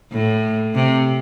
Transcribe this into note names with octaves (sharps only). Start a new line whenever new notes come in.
A2
C3